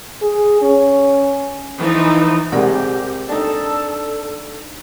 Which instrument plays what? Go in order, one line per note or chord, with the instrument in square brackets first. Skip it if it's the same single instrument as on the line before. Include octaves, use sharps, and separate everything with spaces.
[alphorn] G#4
C#4
[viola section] E3 F3 D#4
[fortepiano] C2 G#3 [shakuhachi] G4 [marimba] A#4 D5 F#5
[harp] D4 D#4 [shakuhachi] A4 [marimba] G5 A5